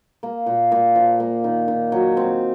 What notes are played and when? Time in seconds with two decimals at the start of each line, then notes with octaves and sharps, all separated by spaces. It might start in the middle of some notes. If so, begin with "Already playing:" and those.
0.23 A#3
0.46 A#2
0.72 A#2
0.95 F3
1.20 A#3
1.44 D#3
1.68 D#3
1.92 F#3
2.17 C4